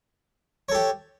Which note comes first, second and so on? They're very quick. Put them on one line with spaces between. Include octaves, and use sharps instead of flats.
C#5 A4 G4